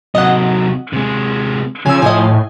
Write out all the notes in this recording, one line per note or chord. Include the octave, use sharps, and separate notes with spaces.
C3 F#3 D#5 F#5
C3 G#3
C#3 F3 G#5 E6
A2 D#5 G#5